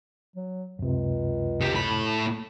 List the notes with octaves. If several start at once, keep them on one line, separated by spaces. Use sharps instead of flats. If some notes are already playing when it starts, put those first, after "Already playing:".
F#3
C#2 F#2 C3
C#3 G4
A2 B5